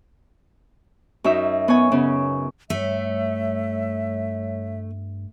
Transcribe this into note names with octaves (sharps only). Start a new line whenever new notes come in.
F#2 D#4 E5
B3 C#5 G#5
C#3 B3 C#4
G2 G3 A3 C#5 E5